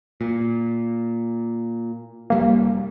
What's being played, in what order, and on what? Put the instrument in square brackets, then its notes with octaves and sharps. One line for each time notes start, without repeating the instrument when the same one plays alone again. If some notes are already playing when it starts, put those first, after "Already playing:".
[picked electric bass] A#2
[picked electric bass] F1 G3 [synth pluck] A#3